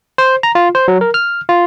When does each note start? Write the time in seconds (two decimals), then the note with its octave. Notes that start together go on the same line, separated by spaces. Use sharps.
0.18 C5
0.43 A#5
0.55 F4
0.75 C5
0.88 F#3
1.01 A#4
1.14 F6
1.49 F4